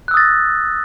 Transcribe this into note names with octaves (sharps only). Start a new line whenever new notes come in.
D#6 E6 F#6 A6 A#6